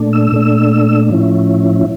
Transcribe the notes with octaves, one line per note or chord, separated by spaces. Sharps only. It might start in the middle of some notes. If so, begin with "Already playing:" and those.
Already playing: A#2 A3 D4
E6
A#2 A3 D4
A2 F3 C#4 E4